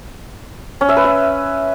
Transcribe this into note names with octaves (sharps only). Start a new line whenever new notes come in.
C#4
E5
B4
E5